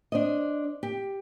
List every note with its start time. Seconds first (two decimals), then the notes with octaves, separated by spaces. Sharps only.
0.12 D4 C5 D#5
0.83 G4